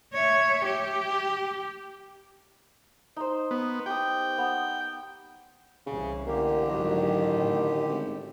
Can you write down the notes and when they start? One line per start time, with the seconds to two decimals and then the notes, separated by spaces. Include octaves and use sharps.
0.14 C#5 E5
0.65 G4
3.16 D#4 C5
3.51 B3
3.86 G4 G5 D#6
4.38 B3
5.87 C2 C#3 E3
6.27 A1 D3 A#3 G4
6.69 G#2 D#3 F#3
7.31 A2
7.90 G#1